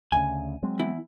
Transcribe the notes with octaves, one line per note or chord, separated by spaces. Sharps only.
D2 C#3 G#5
F#3 G#3 C4
E2 E4